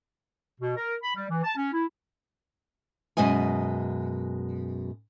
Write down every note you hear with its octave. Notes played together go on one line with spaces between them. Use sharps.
B2
A#4
B5
G3
E3
A5
C#4
E4
F#2 B2 G#3 D#5 G#5